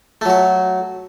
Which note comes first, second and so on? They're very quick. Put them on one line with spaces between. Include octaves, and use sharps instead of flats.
A3 F#3 F#4